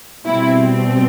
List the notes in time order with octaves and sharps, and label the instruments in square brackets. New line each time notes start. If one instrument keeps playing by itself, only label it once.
[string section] B2 G3 C4 E4